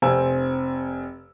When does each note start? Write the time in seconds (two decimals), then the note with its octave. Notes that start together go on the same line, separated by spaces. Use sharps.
0.02 F1 C4 G#5 E6